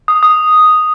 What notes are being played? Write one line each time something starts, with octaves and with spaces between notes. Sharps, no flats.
D#6
D#6